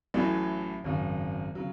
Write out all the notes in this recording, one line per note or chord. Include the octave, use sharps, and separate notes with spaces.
A1 A2 F#3
G#1 F#2 C#3
C#3 F#3